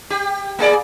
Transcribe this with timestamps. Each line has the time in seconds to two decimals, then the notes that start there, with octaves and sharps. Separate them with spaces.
0.10 G4
0.59 A#3 G#4 D5